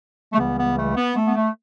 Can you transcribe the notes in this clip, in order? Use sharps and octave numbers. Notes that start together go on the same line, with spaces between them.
A3
C#2 C#3 E3 G3 B3
B3
A3
B3
A3
B3
A3